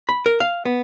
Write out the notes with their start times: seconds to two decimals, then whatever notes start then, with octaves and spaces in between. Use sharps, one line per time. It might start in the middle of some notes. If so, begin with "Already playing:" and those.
0.09 B5
0.26 A#4
0.40 F5
0.65 B3